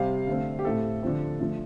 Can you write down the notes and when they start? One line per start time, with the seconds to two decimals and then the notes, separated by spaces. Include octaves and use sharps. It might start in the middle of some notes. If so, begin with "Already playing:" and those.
Already playing: C3 G3 C4 F5
0.27 D3 A3 C4
0.59 G4
0.65 A2 A3 C4 A4
1.02 D3 F3 C4
1.40 D3 F3 A3